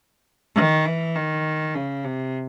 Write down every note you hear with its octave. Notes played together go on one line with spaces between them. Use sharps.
D#3
E3
D#3
C#3
C3